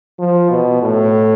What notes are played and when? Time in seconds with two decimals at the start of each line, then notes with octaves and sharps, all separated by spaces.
0.19 F3
0.50 B2
0.83 A2